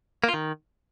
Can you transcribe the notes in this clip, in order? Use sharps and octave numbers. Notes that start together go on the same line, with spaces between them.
A#3
F4
D#3